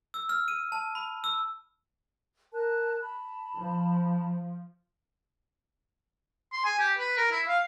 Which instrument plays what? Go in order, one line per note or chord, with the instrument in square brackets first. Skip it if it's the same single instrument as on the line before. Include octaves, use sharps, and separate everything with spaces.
[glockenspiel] E6
F6
D#7
A5
B5
E6
[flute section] A#4 A5 F#6
A5 B5
[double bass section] F3
[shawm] C6
G#5
G4
B4
A#4
E4
F5